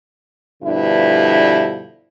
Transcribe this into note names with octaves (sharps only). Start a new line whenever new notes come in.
G2 B2 D3 F3 D4 E4